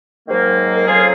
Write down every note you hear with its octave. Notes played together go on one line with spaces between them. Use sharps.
G#2 D#3 F#3 A#3
A#4
F2 C#3 F#3 F4 G#4